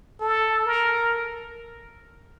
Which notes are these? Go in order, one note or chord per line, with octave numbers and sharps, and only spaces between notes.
A4
A#4